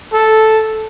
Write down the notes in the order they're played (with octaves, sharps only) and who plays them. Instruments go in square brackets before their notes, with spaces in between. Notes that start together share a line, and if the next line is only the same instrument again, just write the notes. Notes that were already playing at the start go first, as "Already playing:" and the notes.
[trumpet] A4